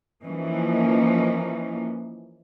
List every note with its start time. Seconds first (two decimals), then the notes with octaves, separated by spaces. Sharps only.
0.24 E3 F3 A#3 C#4 D#4